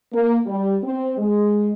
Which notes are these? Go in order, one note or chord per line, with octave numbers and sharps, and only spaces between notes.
A#3
G3
C4
G#3